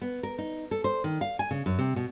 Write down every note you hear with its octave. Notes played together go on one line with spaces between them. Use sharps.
B3
A#4
D#4
A4
C5
D#3
F5
G#5
C#3
F#2
C3
B2